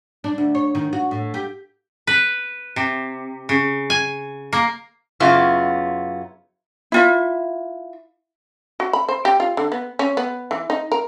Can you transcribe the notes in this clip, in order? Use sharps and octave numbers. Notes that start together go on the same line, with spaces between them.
D4
D2
C#5
D#3
F#4
A2
G4
B4
C3
C#3
G#5
A#3
F#2 C#3 B3 E4 F4
E4 F4 E5
F#4
B5
C5
G4
F4
D3
B3
C#4
B3
E3
D#4
A#4